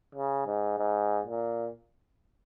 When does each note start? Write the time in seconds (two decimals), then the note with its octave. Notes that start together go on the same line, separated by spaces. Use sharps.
0.15 C#3
0.46 G#2
0.78 G#2
1.26 A#2